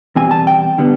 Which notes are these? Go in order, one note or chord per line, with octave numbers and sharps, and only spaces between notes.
E2 B2 G3 C4 G#5
A5
G5
D3 G3 B3